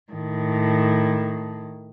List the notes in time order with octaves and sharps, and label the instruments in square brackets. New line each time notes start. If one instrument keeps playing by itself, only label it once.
[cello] A2 D#3